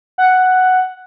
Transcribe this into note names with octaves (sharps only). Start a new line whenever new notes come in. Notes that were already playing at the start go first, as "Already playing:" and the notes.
F#5